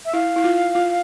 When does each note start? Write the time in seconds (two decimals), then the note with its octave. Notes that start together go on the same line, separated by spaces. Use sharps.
0.05 E5
0.13 E4 F5
0.36 E4
0.44 F4
0.75 F4